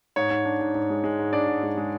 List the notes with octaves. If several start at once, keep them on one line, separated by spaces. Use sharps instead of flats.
G#2 C#5
G#2
D4
G#2
G#2
G#3
G#3
G#2
D4 D5
G#2
G#3
G#3